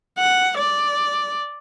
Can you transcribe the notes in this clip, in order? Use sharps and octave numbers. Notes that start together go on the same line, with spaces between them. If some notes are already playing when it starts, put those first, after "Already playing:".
F#5
D5